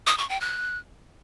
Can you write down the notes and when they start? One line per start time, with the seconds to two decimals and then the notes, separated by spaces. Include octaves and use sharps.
0.07 D#6
0.18 C#6
0.29 G5
0.41 F#6